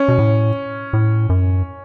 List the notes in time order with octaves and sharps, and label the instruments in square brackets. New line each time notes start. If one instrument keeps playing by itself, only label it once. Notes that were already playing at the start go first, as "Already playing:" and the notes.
Already playing: [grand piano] C#4
[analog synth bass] B2
A2
A2
F#2